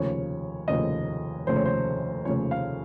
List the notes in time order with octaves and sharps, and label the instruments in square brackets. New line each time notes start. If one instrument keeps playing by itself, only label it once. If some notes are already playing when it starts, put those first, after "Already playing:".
Already playing: [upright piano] F1 D#2 C#3 F3 C#5
F1 D#2 C#3 F3 D#5
F1 D#2 C#3 F3 C5
C#5
C5
F1 D#2 C#3 F3 C#5
F5